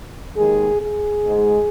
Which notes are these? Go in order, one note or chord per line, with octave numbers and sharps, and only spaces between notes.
D#2 D#3 G#3 G#4
G#4
G#2 G#3